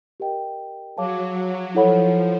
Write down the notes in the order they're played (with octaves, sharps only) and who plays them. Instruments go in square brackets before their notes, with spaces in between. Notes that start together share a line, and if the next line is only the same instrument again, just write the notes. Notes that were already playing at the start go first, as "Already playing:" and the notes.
[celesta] G4 A#4 D#5 G5
[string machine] F#3 [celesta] G#4 C#5 F5 A5 D6
[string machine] F3 [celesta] E4 A4 C#5 F#5 B5